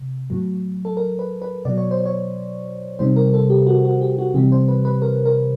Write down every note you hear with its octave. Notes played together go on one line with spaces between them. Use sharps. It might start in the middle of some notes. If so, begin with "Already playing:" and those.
Already playing: C3
A2 F#3
A4
A#4
B4
B4
B2 F#3 D5
C#5
C5
C#5
C3 D#3 G3 C5
A#4
A4
G4
F#4
F#4
G4
F#4
C3 E3 G3 G4
C5
B4
B4
A#4
A#4